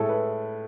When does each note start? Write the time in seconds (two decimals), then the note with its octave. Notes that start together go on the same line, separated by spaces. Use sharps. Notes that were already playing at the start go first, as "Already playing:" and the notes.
Already playing: A2 G#3 A4
0.09 B4